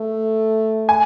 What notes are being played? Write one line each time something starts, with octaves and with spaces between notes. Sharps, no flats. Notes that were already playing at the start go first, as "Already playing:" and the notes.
Already playing: A3
G#5